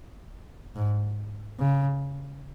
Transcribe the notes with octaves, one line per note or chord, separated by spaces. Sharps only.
G#2
C#3